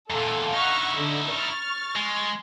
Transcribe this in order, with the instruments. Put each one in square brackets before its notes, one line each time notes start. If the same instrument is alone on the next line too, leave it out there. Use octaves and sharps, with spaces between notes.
[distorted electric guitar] E2 A#2 [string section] A4 F5
[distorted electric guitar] D#4 E4 [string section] F#5 C#6 F6
[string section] D3
C#6 F6 A6
[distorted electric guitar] G#3